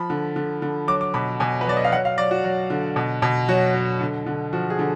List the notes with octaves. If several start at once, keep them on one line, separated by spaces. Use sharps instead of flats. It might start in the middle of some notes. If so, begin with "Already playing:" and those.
Already playing: F3 B5
D3
D3
D3
F#3 D6
D6
B2 B5
B2 G#5
B4
F#3 D5
D#5
F5
F#3 F#5
F5
F#3 D5
F#4
F#3
D3
B2
B2
F#3 F#4
F#3
D3
D3
F3 F#4
G#4
D3